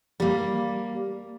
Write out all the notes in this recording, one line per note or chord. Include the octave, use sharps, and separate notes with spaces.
G3 A#3